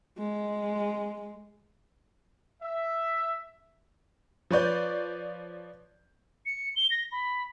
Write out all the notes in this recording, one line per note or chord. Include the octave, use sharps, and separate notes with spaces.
G#3
E5
F3 B4 C#5 D5 G6
C#7
G7
A#6
B5